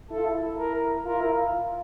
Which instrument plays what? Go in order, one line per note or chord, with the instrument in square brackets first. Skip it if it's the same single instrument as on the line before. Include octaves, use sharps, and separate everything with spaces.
[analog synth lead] E4 [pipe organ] A4
[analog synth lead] F4
E4
[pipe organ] A#4
[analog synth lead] F4 [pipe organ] A#4
[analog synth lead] E4
F4